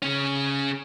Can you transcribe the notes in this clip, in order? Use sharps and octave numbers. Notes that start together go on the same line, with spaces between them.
C#3 C#4